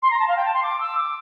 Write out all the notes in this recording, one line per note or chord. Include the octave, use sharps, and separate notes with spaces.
C6
A#5
A5
F5
G5
A5
C6
D6
E6
D6